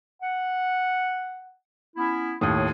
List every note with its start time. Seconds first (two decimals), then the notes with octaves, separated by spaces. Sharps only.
0.21 F#5
1.96 B3 C#4 E4
2.41 D#2 A2 C#5 C6 D#6